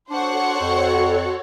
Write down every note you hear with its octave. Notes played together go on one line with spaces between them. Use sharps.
D4 F#4 A4 C5 C#5 F#5 C#6
F2